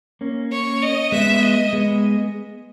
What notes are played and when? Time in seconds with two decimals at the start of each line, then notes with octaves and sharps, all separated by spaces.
0.21 A#3 C#4
0.51 C#5
0.82 D#5
1.12 G#3 B3 E5
1.42 D#5
1.73 G#3 B3